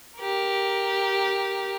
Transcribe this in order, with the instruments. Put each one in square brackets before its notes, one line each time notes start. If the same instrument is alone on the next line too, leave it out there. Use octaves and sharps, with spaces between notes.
[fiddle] G4 A#4